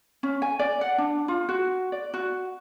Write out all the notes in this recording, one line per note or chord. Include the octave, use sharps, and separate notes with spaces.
C#4
G#5
D5
F#5
D4
F4
F#4
D5
F#4